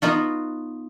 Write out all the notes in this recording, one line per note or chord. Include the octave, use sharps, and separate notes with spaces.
B3 D#4 F4 F#4